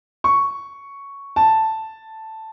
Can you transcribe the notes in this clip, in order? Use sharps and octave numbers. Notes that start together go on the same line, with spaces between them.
C#6
A5